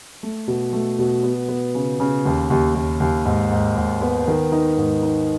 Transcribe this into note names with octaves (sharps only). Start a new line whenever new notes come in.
A3
B2
A3
B2
B3
B3
C#3
C#3
D#2
D#2
D#2
D#2
G#2
G#2
G#2
B3
D#3
D#4
G#2
D#4